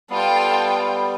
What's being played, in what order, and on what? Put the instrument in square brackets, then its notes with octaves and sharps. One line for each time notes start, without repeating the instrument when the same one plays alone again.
[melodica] G3 B3 [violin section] F4 A4 G5